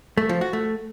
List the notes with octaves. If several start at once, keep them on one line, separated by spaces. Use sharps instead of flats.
A3
F3
F#4
A3